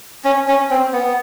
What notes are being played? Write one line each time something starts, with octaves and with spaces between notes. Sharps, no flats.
C#4
C#4
C4
B3